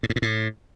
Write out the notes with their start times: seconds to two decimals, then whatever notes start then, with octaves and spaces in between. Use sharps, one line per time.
0.03 A2
0.10 G#2
0.16 A#2
0.22 A2